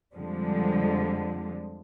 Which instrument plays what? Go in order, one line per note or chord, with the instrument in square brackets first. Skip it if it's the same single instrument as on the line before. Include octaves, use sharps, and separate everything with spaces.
[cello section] F2 D3 F3 G3 G#3